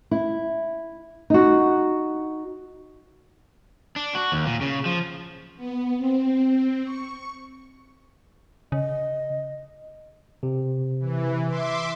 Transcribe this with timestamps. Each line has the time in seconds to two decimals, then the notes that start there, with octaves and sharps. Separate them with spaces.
0.11 E4
1.30 D#4 F#4
3.96 D4
4.15 F#4
4.32 D#2
4.46 A#2
4.61 C#3
4.85 F3
5.57 B3
5.97 C4
6.83 C#6
8.72 C#3 D#5
10.43 C3
11.00 E3
11.47 E5 C6 D6